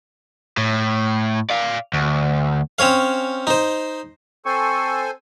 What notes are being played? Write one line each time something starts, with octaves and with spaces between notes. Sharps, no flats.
A2
D5 F5
D2
C4 C#4 C#5 F5
D#4 C5
C4 A4 C5 G#5 C#6